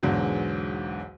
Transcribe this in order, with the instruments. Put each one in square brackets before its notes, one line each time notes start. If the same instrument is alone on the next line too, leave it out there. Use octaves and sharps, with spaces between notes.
[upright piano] B1 E2 G#2 D3 F#3